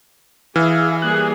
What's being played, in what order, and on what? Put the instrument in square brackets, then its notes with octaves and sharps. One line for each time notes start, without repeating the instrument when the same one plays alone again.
[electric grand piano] E3 [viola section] G#4 [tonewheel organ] E5 F5
[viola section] G3 A#3 G#4 [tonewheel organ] F#6